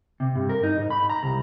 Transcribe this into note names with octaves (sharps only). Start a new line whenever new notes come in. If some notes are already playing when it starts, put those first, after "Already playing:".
C3
G2
A#4
D#4
G#2
B5
A#5
C2